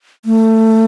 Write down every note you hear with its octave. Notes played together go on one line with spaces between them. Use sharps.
A3